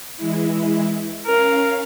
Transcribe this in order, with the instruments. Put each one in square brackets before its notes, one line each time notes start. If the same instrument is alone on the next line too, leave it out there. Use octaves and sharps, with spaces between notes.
[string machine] E3 G#3 E4
[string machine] C#4 F5 [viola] A#4